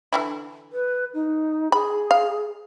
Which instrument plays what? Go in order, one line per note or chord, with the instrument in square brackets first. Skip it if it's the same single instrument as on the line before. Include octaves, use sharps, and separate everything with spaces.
[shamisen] D3 E3 E4
[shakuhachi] B4
D#4
[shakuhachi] G#4 [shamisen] B5
[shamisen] F5